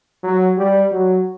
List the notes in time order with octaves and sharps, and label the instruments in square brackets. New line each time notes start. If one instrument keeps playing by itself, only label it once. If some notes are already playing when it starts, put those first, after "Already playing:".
[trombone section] F#3
G3
F#3